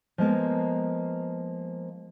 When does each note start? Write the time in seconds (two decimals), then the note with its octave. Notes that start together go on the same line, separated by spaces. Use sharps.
0.18 F3 G#3 A#3 B3